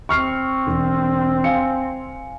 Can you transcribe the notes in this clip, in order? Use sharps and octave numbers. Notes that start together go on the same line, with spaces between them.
C4 C#6 F6 C7
E1
F5 G#5 C#7